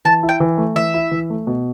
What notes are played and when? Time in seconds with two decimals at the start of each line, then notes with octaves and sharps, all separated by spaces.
0.05 E3 A5
0.23 E4
0.29 G5
0.40 E3
0.58 A3
0.76 E3 E5
0.94 E4
1.11 E3
1.30 A3
1.47 B2